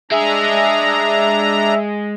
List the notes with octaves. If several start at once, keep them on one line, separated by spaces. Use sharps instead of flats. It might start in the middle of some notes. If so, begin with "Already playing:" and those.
G#3 D4 G#4 E5 A#5